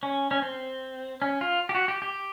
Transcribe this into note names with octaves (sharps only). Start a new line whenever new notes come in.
C#4
C#4
C4
C#4
F4
G4
F#4
G4
G4